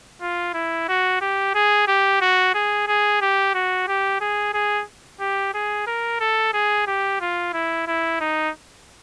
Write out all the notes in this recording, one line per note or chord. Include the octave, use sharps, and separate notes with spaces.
F4
E4
F#4
G4
G#4
G4
F#4
G#4
G#4
G4
F#4
G4
G#4
G#4
G4
G#4
A#4
A4
G#4
G4
F4
E4
E4
D#4